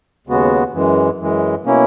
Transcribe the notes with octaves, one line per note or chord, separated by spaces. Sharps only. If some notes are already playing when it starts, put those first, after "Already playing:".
D#2 C#3 G#3 B3 F#4
F#2 E3 G#3
F#2 E3 G#3
B2 A#3 C#4 E4